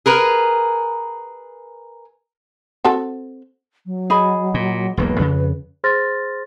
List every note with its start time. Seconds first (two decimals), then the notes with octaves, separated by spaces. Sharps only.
0.06 G#4 A#4 B4
2.84 C4 F#4 A4
3.86 F#3
4.10 G#4 D#5 B5
4.54 A#2
4.97 E1 B1 A#3 B4
5.19 F2 C#3
5.84 G#4 C5 C6 F6 A6 A#6